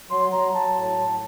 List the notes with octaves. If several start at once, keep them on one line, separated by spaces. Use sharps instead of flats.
F#3 C6
F#3 A#5
F#3 A5
A2
A2